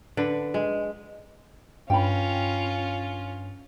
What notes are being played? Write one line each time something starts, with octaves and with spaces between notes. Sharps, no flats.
D3 B4
G#3
G2 C#4 F4 G5 B5